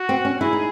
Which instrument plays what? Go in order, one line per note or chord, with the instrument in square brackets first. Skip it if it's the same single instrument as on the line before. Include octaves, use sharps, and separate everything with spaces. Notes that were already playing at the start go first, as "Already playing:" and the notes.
Already playing: [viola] F#4
[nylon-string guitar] C4
C#4
[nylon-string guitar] E4 [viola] G#4
[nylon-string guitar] D#4